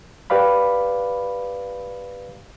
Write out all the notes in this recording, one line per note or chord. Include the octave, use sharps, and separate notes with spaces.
G4 B4 D5 F5 B5